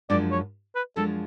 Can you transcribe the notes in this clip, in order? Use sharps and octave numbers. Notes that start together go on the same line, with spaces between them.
F#2 F3 G#3 D4 D5
C#5
B4
F#2 F3 G#3 D4 A4